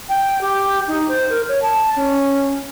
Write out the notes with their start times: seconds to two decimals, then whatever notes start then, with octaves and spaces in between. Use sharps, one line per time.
0.09 G5
0.41 G4
0.88 D#4
1.08 C5
1.30 A#4
1.48 C#5
1.62 A5
1.96 C#4